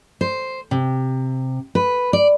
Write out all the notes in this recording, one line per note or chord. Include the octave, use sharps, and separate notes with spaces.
C5
C3
B4
D5